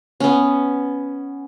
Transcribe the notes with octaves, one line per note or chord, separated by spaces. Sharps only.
B3 C#4